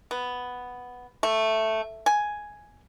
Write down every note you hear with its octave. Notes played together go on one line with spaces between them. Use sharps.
B3
A3
G#5